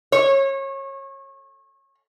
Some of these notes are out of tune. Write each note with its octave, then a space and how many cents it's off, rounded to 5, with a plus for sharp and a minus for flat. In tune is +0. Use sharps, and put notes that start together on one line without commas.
C#5 -30